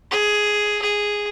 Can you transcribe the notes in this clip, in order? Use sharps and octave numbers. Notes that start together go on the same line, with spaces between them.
G#4
G#4